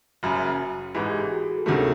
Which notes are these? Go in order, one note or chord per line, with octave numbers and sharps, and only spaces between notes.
F#1 F#2 C#3 F#4
A1 G#2 E3 G#4
G4 A4
G#4
F#4
G#4
G4 A4
D2 C3 D#3 F#3 A3 G#4 A#4